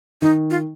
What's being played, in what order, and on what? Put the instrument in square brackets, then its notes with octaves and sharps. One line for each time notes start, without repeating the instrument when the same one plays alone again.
[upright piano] D#3 [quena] D#4
[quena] F4